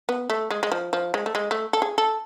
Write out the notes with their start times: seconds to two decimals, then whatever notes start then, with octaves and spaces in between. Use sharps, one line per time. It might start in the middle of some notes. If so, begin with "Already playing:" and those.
0.09 B3
0.30 A3
0.51 G#3
0.63 G#3
0.72 F3
0.93 F3
1.14 G#3
1.26 A3
1.35 G#3
1.51 A3
1.73 A4
1.82 G#4
1.98 A4